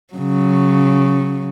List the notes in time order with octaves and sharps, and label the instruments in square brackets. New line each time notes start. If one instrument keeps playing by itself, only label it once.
[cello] C#3 F#3